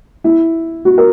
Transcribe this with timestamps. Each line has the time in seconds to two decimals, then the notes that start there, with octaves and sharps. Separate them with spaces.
0.24 E4
0.85 F#4
0.98 A#4